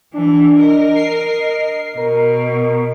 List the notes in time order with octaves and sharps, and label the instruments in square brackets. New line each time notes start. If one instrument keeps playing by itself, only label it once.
[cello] E3 [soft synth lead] D4
[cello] A#4 D#5
[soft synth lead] C7
[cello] B2 [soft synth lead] A#4